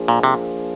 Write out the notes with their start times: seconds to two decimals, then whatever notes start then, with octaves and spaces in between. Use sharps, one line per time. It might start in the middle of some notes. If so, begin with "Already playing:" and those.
Already playing: F3 A#3 D4 G#4
0.08 A#2
0.23 C3